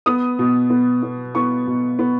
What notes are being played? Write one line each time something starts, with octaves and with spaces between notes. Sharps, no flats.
B3 D#6
B2
B3
B3
B3 C#6
B2
B3